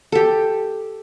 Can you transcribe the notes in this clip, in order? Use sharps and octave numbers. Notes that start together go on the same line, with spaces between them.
G4 A4